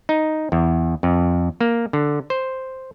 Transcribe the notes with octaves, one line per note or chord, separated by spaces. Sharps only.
D#4
E2
F2
A#3
D3
C5